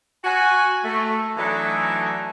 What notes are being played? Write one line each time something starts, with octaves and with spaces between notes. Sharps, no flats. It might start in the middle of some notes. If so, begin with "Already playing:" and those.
F#4 G#5
A3
E3 F#3 A3 D4 D#4 E5